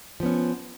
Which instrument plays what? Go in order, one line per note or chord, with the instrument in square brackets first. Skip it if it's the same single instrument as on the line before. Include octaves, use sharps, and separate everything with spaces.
[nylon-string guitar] F3
B3
C#4